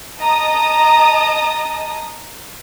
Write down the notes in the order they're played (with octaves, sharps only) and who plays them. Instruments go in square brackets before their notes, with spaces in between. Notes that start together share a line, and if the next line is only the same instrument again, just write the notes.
[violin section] D#5 A5 A#5 D#6